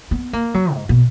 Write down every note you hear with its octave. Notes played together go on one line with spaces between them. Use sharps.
B3
A#3
F#3
G#2
B2